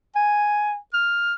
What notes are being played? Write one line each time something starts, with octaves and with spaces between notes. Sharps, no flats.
G#5
F6